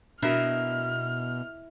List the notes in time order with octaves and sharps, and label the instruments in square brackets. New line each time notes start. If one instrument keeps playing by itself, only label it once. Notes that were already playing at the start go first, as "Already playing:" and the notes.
[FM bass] B2 [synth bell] D4 F#4 [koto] E4 A#4 D#5 [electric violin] F6